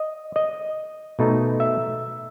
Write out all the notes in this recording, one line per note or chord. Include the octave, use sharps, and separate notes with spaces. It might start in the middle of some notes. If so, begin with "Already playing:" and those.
Already playing: D#5
D#5
B2 A3 D#4
E5